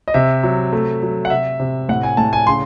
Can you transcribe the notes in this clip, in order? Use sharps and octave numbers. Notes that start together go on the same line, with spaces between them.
D#5
C3 E5
F#3
A3
F#3
F#5
C3 E5
C3
A2 F#5
G#5
A2 A5
G#5
C#3 C6